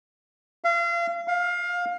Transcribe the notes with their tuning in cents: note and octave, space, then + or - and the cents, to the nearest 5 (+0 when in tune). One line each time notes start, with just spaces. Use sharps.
F5 -35
F5 +20